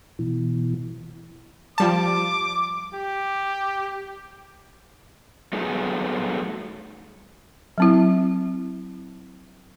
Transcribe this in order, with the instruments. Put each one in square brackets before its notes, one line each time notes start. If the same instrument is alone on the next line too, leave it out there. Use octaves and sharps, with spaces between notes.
[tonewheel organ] B2 E3
[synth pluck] F3 G3 A5 [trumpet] D6
[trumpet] G4
[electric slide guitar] F#3 G3 A3 B3 D#4 G#4
[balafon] F#3 C4 E4